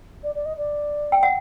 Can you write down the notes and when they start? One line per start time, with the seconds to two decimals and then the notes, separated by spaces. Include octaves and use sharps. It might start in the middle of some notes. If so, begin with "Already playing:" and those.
0.23 D5
0.34 D5
0.45 D#5
0.57 D5
1.12 G5
1.23 F#5